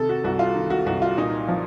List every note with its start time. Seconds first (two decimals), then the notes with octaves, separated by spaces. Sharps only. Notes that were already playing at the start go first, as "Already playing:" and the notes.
Already playing: C3 D#3 A4
0.09 F#4
0.24 C2 F#4
0.39 F4
0.55 D#3
0.70 F#4
0.86 C2 F#4
1.02 F4
1.17 A#2 D#4
1.48 F3